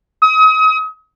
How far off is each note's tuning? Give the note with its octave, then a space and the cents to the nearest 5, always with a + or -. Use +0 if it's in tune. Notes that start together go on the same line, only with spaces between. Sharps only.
D#6 +35